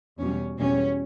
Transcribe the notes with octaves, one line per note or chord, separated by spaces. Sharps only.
E2 B2 G3 C#4
E2 B2 G3 C#4